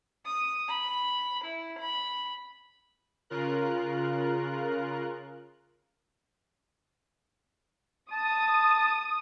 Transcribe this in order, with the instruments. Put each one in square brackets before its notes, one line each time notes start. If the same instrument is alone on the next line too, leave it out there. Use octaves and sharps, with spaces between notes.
[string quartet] D#6
B5
E4
B5
[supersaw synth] C#3 F4 A#4 F#6
[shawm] A5 [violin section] D#6